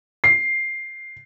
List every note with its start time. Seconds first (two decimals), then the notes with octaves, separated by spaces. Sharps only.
0.24 C7